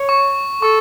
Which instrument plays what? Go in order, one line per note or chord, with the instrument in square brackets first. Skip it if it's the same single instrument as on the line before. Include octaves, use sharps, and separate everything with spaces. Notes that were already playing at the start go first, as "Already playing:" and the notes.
Already playing: [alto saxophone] C#5
[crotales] C#6
[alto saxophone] A4 [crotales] C#6